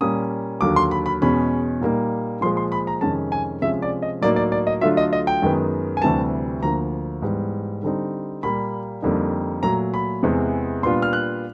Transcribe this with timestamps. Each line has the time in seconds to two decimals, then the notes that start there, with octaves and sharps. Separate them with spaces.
0.01 A#2 G3 A#3 C#4 D#6
0.61 D#2 D3 F#3 D6
0.76 C6
0.91 B5
1.06 B5
1.22 E2 B2 G#3 C#4 B5
1.81 A#2 G3 A#3 D#4
2.41 A#2 F3 G#3 C6
2.57 C6
2.72 B5
2.87 A#5
3.01 F2 C3 D#3 G#3 C#4 A5
3.32 G#5
3.62 C3 F3 G#3 C#4 E5
3.82 D5
4.02 D#5
4.21 A2 F#3 A#3 D#4 D5
4.36 D5
4.52 D5
4.67 D#5
4.81 D3 F#3 A3 D4 F4 E5
4.97 D#5
5.13 D#5
5.27 G5
5.42 F#2 D#3 G#3 B3
5.97 G#5
6.02 D2 C3 E3 G3 A5
6.62 D2 D3 F3 A#3 A#5
7.22 G#2 E3 G3 B3
7.83 D3 G3 C4 D#4
8.43 A#2 G3 A#3 B5
9.02 F2 D3 G3 A#3 D#4
9.63 A#2 F#3 A3 A#5
9.94 B5
10.23 E2 C3 E3 G#3 B3
10.83 A#2 G3 B3 D4 F4 C6
11.02 F6
11.13 F#6